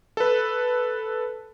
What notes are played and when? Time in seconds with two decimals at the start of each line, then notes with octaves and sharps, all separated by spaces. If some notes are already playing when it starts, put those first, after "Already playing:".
0.17 A4 B4